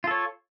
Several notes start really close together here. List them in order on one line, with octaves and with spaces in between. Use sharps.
F4 A4 C#5